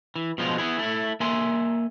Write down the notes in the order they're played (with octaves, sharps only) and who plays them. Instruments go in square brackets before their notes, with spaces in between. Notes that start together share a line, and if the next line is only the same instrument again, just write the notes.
[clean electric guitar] E3
B2 F3 G#3 B3 F4
B3 E4 G#4
A3 E4
A#3 E5 G#5 C6